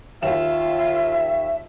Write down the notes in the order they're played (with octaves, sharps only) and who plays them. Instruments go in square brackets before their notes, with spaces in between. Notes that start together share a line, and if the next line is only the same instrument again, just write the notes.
[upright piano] D#2 E7 [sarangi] F4 [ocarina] E5